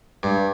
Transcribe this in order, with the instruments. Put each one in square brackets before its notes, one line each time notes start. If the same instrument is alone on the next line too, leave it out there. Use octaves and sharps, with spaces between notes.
[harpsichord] G2